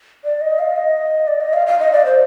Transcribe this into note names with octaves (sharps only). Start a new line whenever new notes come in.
D5
D#5
F5
D#5
D5
D#5
F5
F5
D#5
D5
C5